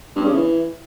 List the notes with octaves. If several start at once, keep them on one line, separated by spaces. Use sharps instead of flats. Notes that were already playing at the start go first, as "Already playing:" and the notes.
G2
C#3
E3